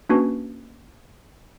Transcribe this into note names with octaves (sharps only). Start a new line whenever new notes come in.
A#3 C#4 D4 F#4 B4